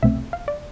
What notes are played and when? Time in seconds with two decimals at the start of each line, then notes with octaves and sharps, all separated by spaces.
0.03 C2 B2 A3 C4 E5
0.33 F5
0.48 D5